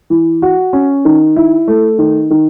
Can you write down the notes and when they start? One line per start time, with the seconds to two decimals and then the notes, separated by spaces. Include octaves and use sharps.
0.10 E3
0.42 F#4
0.73 C#4
1.05 D#3
1.36 E4
1.68 A3
1.98 D#3
2.31 D#3